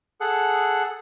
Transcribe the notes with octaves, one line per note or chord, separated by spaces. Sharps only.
G#4 A4 F#5